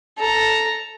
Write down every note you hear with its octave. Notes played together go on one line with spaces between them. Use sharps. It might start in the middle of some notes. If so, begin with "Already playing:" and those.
A4 A#5